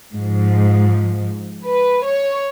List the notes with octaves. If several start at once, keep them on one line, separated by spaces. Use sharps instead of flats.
G#2 F3
B4
C#5